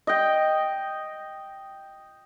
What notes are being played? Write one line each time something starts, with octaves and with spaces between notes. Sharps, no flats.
D#5 G5